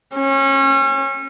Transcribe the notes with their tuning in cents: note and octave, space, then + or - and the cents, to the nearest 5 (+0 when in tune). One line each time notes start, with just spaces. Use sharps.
C#4 -30